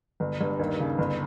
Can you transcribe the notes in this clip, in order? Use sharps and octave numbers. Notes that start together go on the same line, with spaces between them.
G1
G2
D#2
C#3
G1